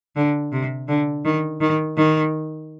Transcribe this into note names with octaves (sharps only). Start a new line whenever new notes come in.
D3
C3
D3
D#3
D#3
D#3